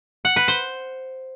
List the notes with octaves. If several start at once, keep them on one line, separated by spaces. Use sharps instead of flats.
F#5
B4
C5